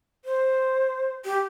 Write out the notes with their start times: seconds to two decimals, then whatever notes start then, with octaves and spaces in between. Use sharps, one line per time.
0.25 C5
1.25 G4